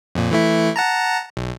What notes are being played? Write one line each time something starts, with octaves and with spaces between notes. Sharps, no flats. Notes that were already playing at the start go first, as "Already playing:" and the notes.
F2 A#2
E3 A3 E4
F#5 A5 A#5
B1